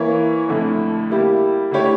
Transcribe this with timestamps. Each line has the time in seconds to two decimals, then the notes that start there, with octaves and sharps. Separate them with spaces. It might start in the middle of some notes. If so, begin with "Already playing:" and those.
Already playing: E3 A#3 E4 A#4 C#5
0.49 F2 D3 A3 E4
1.10 G3 A#3 E4 G4
1.71 D3 A3 E4 G4 C#5